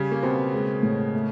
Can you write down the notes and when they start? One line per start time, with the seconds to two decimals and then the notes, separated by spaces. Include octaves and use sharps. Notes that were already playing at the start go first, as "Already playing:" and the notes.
Already playing: C#3 G3 C#4
0.11 A#3
0.22 B2 B3 C4
0.54 G#3
0.83 A2
1.14 A3